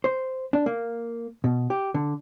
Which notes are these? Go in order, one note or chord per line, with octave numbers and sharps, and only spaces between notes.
C5
D4
A#3
B2
G4
D3